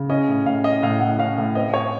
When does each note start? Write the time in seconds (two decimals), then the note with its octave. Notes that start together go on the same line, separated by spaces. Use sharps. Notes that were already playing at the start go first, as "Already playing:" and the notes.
Already playing: C#3
0.09 C#4 D#5
0.28 A2
0.46 A2 F5
0.64 C#4 D#5
0.83 A2 F5
1.00 A2 F#5
1.19 C#4 F5
1.38 A2
1.55 C4 D#5
1.74 C4 C#5